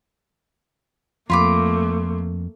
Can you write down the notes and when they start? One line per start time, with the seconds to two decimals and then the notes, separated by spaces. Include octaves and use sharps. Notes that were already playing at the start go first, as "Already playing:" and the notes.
1.30 F2 A3 A#3 F4 B5 D6